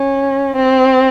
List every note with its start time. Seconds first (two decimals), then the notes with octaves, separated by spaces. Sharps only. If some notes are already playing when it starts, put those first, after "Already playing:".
Already playing: C#4
0.54 C4